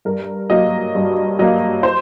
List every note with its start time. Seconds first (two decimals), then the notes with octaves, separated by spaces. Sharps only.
0.05 G2 A#4
0.50 F#3 A#3 D#5
0.95 G2
1.39 F#3 A#3 D#5
1.83 C5